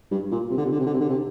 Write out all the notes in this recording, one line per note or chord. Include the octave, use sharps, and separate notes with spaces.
G2
A#2
C3
D3
C3
D3
C3
D3
C3
D3
C3